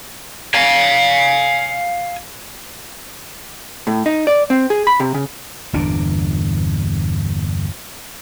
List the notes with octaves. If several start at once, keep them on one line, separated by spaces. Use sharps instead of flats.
F5 G#5
A2
D#4
D5
C4
G#4
B5
C3
C#3
G1 E2 A#2 D4